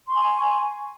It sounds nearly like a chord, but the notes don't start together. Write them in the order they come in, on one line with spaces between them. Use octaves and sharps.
C6 C#6 G#5